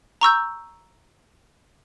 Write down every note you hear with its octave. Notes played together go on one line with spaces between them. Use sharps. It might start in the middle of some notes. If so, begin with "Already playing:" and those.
A#5 C#6 E6 G6